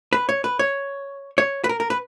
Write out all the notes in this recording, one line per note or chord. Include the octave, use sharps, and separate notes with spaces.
B4
C#5
B4
C#5
C#5
B4
A#4
A#4
B4